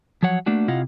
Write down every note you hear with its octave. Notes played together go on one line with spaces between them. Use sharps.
F3 F#3 C#5 F#5
A3 A#3 D4 F#4
C3 E4 F4 D#5 F5 F#5